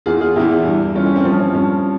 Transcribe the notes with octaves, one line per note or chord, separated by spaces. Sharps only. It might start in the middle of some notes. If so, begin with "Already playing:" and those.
E2 E3 F4 G#4
F4 G#4
E2 E3 E4 G4
G2 E3
G2 E3 C#4 F4
C#4
C4
G2 F3 C#4
C#4
G2 F3 C#4